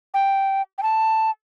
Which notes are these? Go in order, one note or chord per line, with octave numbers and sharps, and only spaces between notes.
G5
G5
A5